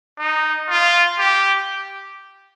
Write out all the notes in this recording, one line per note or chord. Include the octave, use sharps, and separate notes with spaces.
D#4
F4
G4